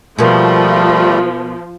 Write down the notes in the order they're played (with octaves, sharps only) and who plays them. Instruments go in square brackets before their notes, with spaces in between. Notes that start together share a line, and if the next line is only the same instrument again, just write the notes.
[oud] B2 A#3 [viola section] F3 [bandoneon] G3 A3